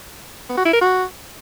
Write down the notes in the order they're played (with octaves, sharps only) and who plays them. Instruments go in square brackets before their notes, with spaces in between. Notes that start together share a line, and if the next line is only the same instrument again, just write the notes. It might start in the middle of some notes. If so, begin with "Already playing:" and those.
[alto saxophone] B3
F#4
E4
A#4
F#4